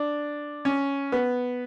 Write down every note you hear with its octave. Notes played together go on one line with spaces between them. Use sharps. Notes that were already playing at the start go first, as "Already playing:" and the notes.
Already playing: D4
C#4
B3